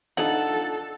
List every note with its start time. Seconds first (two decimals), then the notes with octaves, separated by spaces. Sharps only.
0.17 D4 D#4 F4 A4 F#5